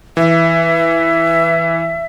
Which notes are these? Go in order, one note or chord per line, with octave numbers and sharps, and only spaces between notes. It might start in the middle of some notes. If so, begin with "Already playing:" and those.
E3 E5